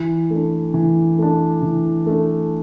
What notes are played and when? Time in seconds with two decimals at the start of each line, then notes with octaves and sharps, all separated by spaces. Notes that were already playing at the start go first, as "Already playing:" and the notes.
Already playing: E3
0.30 A3 D4
0.74 E3
1.18 A3 D4
1.62 E3
2.06 A3 D4